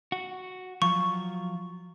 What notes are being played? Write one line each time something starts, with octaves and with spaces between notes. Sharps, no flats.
F#4
F3 F#3 F4 C#6